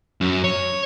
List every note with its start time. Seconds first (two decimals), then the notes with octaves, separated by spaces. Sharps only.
0.21 F#2
0.44 C#5